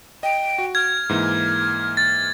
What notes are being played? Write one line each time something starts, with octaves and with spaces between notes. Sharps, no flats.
D#5 G5
F#4
F6 G#6
G#2 E3 A#3
A6